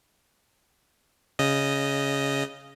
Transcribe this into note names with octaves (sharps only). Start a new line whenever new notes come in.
C#3 D#5